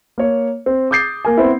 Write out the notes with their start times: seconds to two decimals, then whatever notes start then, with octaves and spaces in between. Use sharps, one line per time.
0.18 A#3 C#5
0.66 C4
0.91 D6 D#6 G6 A6 C7
1.25 A#3 A#4 G#5
1.37 B3 C4 E4